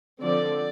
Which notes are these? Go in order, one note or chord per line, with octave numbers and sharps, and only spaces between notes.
D3 F3 C4 D5